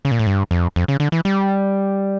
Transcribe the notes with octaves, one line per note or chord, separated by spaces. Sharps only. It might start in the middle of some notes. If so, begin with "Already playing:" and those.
C#3
A#2
A2
G2
F2
F2
C#3
D3
E3
G3